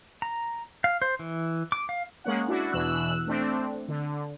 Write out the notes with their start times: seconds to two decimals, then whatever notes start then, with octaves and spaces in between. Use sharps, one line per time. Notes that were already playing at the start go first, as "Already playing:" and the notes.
0.22 A#5
0.84 F5
1.02 C5
1.19 E3
1.72 D6
1.89 F5
2.24 G#3 A#3 C#4 F#5
2.48 D4 E4 F#4
2.72 E2 B2 E3 E6 F#6
3.27 A3 C4 D4
3.88 D3